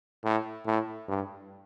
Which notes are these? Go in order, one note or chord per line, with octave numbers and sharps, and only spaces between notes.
A2
A2
G2